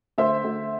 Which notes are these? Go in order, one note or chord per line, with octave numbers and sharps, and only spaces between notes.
D2 C5 E5
D2